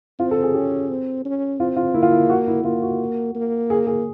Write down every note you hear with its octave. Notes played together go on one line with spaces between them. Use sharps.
C4 F4
A4
G#4
C#4 G4
C4
C#4
C4 F4
F4
A#3 E4
F4
E4
F#4
E4
A#3 F4
F#4
A#3
G#4
G#4